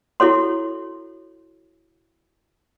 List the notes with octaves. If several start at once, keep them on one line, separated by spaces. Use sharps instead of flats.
E4 F#4 A4 C#5 C6